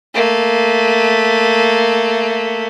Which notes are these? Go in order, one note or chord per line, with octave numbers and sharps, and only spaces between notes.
A3 A#3